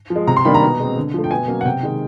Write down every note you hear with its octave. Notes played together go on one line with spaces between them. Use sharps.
F3
G#3
C3 A#5
C6
D#3 G3 A#3 D4 B5
A#5
B2
G#3 C4
D3
F3 A3
G5
B2 G#5
F#3 A#3 C#4
F#5
C3 G5
D#3 G#3